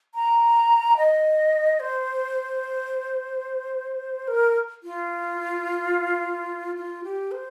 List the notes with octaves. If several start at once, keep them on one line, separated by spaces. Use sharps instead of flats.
A#5
D#5
C5
A#4
F4
F4
G4
C5